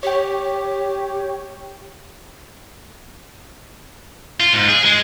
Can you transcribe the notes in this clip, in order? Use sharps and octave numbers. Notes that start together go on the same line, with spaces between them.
G4 C#5 G5
F4
G#2
G#4
G#3